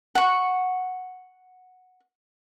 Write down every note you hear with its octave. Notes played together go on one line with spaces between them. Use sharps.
F#5 C#6